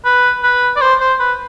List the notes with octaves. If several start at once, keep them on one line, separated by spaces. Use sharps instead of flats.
B4
B4
D5
C5
C5
B4